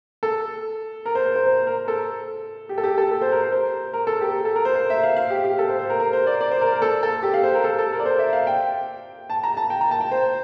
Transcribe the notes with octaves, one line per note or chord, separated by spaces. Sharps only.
A4
A#4
C5
C5
C5
C5
A#4
A4
G4
A4
G4
A4
A4
C5
A#4
C5
C5
A#4
A4
G4
A4
A#4
C5
C5
E5
F5
F5
G4
G4
A4
C5
C5
A#4
A#4
C5
D5
D5
C5
A#4
A#4
A4
A4
G4
F5
C5
A#4
A4
A4
A#4
D5
C5
E5
F5
G5
A5
A#5
A5
G5
A#5
A5
G5
C5